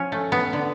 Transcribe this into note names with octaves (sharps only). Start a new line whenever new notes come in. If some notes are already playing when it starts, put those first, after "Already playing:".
Already playing: F3 C#4
A3
B3
D3